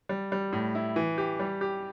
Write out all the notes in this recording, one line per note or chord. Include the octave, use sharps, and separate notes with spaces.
G3
G3
A2
E4
E3
G4
G3
G4